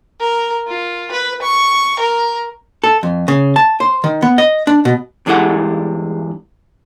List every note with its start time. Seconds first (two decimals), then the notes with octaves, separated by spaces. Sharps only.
0.20 A#4
0.67 F4
1.11 B4
1.42 C#6
1.99 A#4
2.84 A4
3.03 F2
3.28 C#3
3.56 A5
3.80 C5
4.04 D#3
4.22 B3
4.38 D#5
4.67 D4
4.85 B2
5.26 E2 G2 G#3 E4 A4 F#5